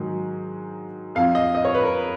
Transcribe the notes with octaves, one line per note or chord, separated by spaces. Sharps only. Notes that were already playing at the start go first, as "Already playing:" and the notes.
Already playing: G#2 D#3 F#3
F2 F3 F5
D#5
D#5
C#5
B4
A#4